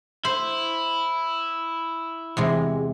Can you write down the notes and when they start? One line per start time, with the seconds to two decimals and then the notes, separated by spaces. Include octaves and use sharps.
0.25 E4 C5
2.37 E2 C3 G#3